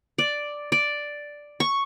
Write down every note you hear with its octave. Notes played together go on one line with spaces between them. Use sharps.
D5
D5
C#6